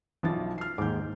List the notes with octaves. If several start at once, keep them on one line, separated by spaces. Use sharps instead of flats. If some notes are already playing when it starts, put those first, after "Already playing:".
B1 E3 F3 A6
F6 C7
D#2 G#2 D6 G6